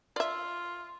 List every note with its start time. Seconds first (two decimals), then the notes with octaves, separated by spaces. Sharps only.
0.16 F4 D5 E5